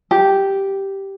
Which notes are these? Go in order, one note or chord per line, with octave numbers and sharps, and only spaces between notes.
G4